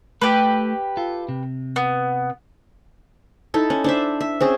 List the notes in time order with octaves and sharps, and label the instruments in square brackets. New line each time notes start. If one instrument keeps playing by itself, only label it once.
[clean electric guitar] A3 A4 [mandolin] G4 B4
[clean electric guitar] F4 A4
C3
[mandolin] B3
[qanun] D#4 E4 A4
C#4
D4 C5 E5
E5
C4 C#4 G#4